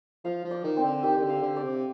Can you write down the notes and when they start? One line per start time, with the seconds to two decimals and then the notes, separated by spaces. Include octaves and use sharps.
0.24 F3 F5
0.44 F3
0.51 D5
0.64 D#3
0.77 C4
0.83 D3
1.03 D#3 G4
1.16 D#3
1.22 D3
1.29 F5
1.42 D3
1.56 D5
1.63 C3